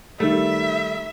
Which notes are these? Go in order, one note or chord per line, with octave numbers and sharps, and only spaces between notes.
D#3 G3 A3 E5